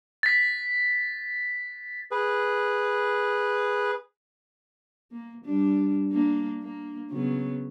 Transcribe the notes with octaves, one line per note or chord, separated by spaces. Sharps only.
A6 B6
G#4 B4
A#3
G3 D4
A#3 D4
A#3
C#3 F#3 B3